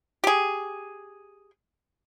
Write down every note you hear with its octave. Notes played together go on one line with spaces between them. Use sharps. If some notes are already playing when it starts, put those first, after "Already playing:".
G4 G#4